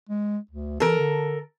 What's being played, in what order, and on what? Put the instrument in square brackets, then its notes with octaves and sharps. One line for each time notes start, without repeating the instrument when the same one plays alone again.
[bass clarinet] G#3
D2
[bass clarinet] E3 [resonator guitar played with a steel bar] A4 A#4
[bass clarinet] D3